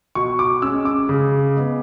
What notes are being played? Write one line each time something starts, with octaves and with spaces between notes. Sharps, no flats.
B2 C#6
D6
G#3 C#4 E6
D6
C#3
G#3 B3